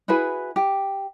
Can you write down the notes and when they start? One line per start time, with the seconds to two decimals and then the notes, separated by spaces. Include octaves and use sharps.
0.08 E4 F#4 G#4 B4
0.56 G4